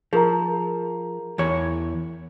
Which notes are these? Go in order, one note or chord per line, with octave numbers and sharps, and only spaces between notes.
F3 G#4 A#4 A#5
E2 E3 C#5